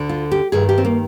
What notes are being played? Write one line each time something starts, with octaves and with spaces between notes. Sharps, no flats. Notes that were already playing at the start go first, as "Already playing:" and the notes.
Already playing: D2 D3
F4
G4
G2 D#3 G#4
G4
C4
A#3